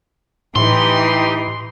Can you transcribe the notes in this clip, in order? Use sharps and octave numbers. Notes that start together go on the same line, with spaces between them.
A2 E3 D#4 G4 C6